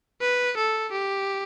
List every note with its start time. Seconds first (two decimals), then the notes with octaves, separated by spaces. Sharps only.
0.21 B4
0.57 A4
0.92 G4